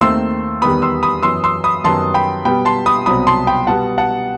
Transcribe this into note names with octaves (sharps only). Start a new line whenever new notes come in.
D#2 D#3 A3 C4 C6 E6
E2 D#3 G3 B3 B5 D#6
C6 E6
B5 D#6
F#2 E3 B3 C6 E6
C6 E6
B5 D#6
F#2 D#3 G3 B3 A5 C6
G5 B5
B2 G3 B3 G5 B5
A5 C6
B5 D#6
C2 B2 F#3 C4 B5 D#6
A5 C6
G5 B5
B2 G3 B3 F#5 A5
F#5 A5